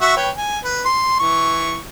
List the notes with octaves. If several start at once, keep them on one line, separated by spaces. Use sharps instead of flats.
F#4 E5 C#6
B4 C#5 G5
G#5
B4
C6
E3 C#6